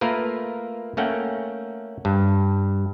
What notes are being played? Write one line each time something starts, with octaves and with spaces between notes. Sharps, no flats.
A3 A#3 F4 A#4 B4
A3 A#3 C#4 F#5 G5
G2